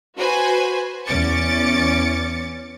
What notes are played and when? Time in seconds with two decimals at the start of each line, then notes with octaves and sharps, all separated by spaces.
0.16 F#4 B4 C5 G#5
1.07 E2 C#4 D6 A6 C#7